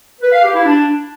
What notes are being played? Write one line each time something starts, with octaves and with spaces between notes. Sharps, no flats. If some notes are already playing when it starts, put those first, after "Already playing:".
B4
F5
G4
E4
D4